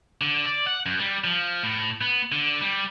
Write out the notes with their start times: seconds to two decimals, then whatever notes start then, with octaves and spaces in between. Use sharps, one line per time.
0.21 D3
0.46 D5
0.67 F#5
0.86 F#2
0.99 G3
1.24 F3
1.63 A2
2.01 B3
2.32 D3
2.61 G3